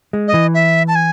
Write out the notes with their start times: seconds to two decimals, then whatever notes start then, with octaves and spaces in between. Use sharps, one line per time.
0.13 G#3
0.28 D#5
0.34 E3
0.54 E5
0.88 A5
0.95 G#5